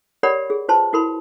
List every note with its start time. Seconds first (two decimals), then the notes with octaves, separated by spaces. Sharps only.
0.23 G4 A#4 C#5 D5 F#5 B5
0.50 G#4
0.69 F4 B4 C5 A5 C6
0.93 E4 F#4 A#4 B5 C6